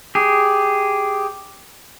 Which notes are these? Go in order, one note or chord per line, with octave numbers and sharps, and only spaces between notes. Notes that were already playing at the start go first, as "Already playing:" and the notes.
G4 G#4